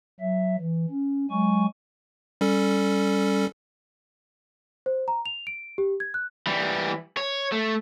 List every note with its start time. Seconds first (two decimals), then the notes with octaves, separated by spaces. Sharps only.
0.20 F#3 E5
0.59 E3
0.90 C#4
1.31 F#3 G#3 G#5 C#6
2.41 G3 C#4 A4
4.86 C5
5.08 A#5
5.26 F7
5.47 D7
5.78 G4
6.00 G#6
6.14 F#6
6.47 E3 G3
7.17 C#5
7.53 A3